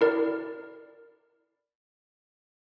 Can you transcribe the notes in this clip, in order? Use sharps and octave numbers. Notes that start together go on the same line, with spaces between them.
E4 A#4 D5